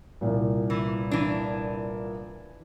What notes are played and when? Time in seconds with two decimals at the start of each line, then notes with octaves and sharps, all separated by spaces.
0.21 C2 A#2
0.70 E3
1.11 E3 D4